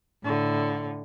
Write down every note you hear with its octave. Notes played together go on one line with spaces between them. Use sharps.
A2 D3